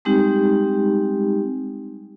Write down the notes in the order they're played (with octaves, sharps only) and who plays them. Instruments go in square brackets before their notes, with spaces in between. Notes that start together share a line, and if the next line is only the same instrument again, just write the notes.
[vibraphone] G3 G#3 C4 D#4 G4